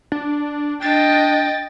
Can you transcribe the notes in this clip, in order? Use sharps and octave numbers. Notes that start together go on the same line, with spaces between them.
D4
D4 D#5 G5 A6